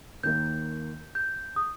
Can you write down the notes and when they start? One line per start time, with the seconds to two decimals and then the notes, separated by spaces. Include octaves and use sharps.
0.23 D#2 D#3 A#3 G6
1.15 G6
1.56 D#6